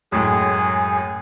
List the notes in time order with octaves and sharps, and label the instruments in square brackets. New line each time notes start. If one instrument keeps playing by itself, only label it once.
[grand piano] F#2 A2 G#3 [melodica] G#4